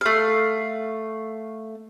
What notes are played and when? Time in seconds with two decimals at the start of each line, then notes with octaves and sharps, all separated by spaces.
0.01 A3 F5